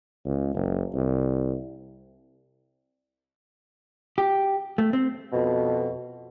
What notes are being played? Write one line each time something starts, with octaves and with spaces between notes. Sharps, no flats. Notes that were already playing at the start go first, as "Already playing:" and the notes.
C#2
F#1
C2
G4
A3
C4
F2 B2